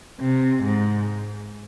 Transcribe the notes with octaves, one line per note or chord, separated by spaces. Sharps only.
C3
G#2